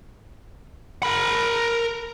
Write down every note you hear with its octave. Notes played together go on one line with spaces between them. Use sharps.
A#4 B5